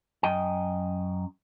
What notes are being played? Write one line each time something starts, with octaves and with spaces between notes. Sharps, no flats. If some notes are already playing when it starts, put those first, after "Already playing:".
F#2 D#5 G5